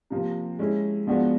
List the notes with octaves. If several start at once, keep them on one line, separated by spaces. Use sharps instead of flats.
C3 F3 A#3
G#3 C#4 E4
F3 G#3 B3 D4 F#4